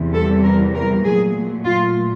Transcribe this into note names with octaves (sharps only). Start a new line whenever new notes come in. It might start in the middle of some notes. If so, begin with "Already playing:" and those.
Already playing: E2 C3 E3 G3
A4
A#4
A#4
A#2 F#3 A3 G#4
F4